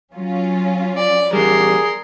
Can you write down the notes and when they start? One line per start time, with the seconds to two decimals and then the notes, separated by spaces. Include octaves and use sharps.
0.14 F#3 C#4 F4
0.97 D5
1.33 E2 G3 G#4 A#4 C6